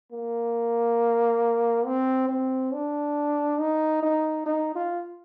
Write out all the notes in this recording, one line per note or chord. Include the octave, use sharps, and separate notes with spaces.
A#3
C4
C4
D4
D#4
D#4
D#4
F4